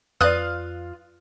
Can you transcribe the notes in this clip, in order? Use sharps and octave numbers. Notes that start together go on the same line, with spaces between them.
F2 F4 B4 D5 F5 D#6 F#6